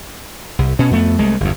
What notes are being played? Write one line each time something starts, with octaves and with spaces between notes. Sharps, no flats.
C2
B2 C#4
F2 A3 B3
C2 G#3 A3
G1 E2